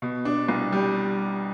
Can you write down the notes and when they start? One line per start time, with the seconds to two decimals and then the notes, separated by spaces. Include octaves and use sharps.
0.02 B2
0.25 D4
0.48 C2
0.72 G3